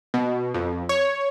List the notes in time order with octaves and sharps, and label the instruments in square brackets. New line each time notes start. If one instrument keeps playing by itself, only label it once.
[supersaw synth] B2
F2
C#5